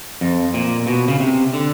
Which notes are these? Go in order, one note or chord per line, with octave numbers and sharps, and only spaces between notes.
F2
A#2
B2
C#3
C3
D3